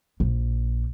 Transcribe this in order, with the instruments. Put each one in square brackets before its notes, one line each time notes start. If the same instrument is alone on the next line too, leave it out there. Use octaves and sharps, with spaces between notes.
[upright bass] A#1